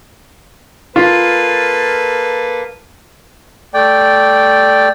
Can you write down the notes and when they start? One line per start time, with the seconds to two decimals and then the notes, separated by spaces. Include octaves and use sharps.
0.96 A#3 F4 A4 B4
3.74 A3 D5 G5